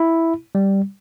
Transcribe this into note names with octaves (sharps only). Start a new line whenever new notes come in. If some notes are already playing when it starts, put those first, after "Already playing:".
Already playing: E4
G3